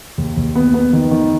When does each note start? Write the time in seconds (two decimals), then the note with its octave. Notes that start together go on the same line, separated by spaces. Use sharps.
0.18 D#2
0.37 D#2
0.55 B3
0.74 B3
0.93 D#3
1.11 D#3